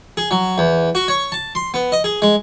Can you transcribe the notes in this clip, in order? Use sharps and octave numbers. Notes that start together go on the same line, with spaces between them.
G#4
F#3
E2
F#4
C#5
A5
C6
B3
D#5
G#4
G#3